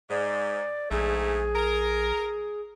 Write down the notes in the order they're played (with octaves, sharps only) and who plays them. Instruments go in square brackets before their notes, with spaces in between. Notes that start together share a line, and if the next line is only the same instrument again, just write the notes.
[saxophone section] G#2 [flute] D5
[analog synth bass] A#1 [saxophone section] G#2 A3 [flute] G#4
[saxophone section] A#4